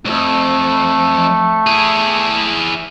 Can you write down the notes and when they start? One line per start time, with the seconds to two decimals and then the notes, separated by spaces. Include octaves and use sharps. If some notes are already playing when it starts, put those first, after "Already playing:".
0.06 C2 F2 A3
1.67 E4 G#4